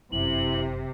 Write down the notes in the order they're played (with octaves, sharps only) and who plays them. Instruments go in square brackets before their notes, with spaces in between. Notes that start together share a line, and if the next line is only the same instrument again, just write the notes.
[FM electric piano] G1 F#2 [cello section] C3 [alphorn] E4 [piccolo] F#7